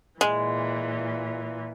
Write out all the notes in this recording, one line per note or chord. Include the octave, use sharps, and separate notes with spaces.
A#2 E3 G#3